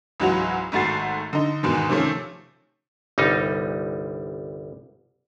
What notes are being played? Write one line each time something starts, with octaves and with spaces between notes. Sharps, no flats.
C#2 G#2 E3 F#3 F#4 F7
G#1 G#2 A3 F#4 A6 C7
D3 D#4
E2 G#2 B2 D#3
C3 D#3 F3 A3 C#4
G1 C2 G3 D#4